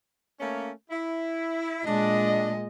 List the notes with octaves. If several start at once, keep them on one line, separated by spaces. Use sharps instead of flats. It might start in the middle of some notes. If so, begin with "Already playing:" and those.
A3 A#3 C#4
E4
A#2 G#3 D4 D#5